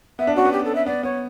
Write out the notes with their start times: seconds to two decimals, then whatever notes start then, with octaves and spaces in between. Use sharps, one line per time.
0.19 B3 E5
0.27 D4
0.36 C#4 F#4
0.45 B3
0.53 G4
0.65 A4
0.75 E5
0.86 B3 D5
1.03 B3 C#5